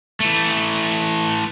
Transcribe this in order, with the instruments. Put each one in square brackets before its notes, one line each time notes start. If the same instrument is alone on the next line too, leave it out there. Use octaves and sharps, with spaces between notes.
[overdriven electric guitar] E3 A3